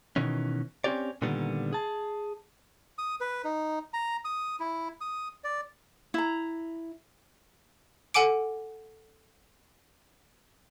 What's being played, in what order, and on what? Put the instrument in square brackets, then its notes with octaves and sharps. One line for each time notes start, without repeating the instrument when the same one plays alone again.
[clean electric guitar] B2 D#3 E3 C#4
C4 C#4 D#4 G4 C#5 D5
A#2 D3 D#3 G3 B3
G#4 A5
[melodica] D#6
B4
D#4
A#5
D#6
E4
D#6
D5
[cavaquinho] E4 A#5
[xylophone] A4 F#5 G#5 D6 D7